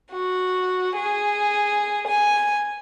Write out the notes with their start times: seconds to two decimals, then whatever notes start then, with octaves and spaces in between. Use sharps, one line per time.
0.13 F#4
0.97 G#4
2.08 G#5